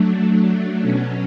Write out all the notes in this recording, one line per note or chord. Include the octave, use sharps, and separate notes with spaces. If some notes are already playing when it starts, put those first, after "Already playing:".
Already playing: F#3 A3 D4
B2 F#3 C#4